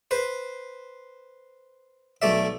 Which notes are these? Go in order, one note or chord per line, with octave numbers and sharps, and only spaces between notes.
B4 C5
B1 A3 D5 E5